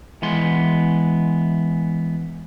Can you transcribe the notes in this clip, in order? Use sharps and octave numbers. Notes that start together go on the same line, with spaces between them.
E3 G#3 B3 C6